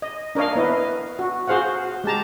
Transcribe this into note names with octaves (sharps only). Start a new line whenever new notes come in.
D#5
D4 A#4 C#5 D#5 F5
B3 E4 D#5
F#4
F#4 G#4 C5 F5 F#5
G#3 G4 A5 A#5